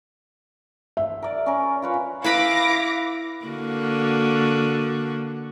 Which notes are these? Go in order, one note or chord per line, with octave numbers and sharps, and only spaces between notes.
E5
A#4 D5
C#4 A#4
F4 B4 C#5
E4 B4 F5 B5 D6 A#6
D3 A#3 F#4